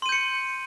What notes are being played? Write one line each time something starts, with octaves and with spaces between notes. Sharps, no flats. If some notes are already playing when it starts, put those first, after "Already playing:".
C6 G6 C#7 D#7